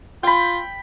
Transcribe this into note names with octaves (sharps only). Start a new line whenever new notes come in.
F4 G5 B5